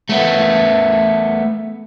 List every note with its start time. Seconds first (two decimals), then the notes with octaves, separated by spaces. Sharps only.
0.09 A3 B3